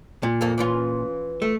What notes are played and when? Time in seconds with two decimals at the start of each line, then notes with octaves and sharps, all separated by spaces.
0.23 A#2
0.41 F2 A#3 A4
0.58 E3 C#4 F4
1.42 A3